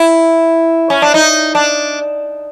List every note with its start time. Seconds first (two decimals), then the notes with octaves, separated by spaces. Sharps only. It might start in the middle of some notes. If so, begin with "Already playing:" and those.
Already playing: E4
0.90 C#4
1.02 D4
1.14 D#4
1.55 D4